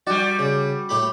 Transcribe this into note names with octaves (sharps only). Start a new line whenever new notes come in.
G3 F#4 D5
C#3
A2 G4 B5